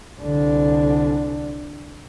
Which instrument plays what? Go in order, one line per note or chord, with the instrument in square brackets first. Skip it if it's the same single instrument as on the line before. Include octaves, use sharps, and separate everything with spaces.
[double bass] C2 D3